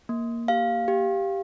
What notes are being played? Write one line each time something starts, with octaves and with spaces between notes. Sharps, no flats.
A#3
G4 F5
G4